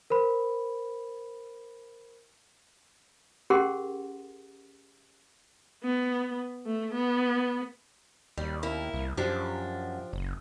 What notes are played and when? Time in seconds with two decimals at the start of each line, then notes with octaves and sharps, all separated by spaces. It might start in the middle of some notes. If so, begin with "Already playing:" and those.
0.10 A#4 C5 B5
3.50 C#4 G4 G#4 A#4 F#5 C6
5.83 B3
6.65 A3
6.94 B3
8.38 D#2 G3
8.63 A#3 E4
8.94 C2
9.17 F#2 F3 D4 G4
10.13 F#1